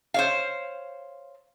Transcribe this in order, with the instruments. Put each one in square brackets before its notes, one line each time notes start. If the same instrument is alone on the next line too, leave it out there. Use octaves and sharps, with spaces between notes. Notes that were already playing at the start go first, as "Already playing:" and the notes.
[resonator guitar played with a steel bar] C5 C#5 F5